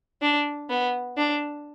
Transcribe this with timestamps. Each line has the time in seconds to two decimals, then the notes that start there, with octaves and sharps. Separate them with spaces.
0.22 D4
0.69 B3
1.17 D4